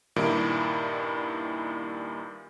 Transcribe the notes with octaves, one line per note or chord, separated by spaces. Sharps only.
G2 A#2 D#3 G3 E4 D7